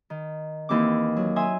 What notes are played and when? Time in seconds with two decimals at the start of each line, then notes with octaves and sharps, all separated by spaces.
0.10 D#3
0.69 D#2 E3 C4 D6
1.16 F#3
1.36 E5 G#5 C6 D#6